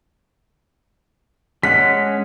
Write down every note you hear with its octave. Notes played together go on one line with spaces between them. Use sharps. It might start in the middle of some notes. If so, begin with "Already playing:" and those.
G#3 C#4 F#5 B6